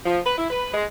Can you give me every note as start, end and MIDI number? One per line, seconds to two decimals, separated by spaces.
0.06 0.20 53
0.26 0.34 71
0.38 0.48 64
0.51 0.70 71
0.74 0.84 56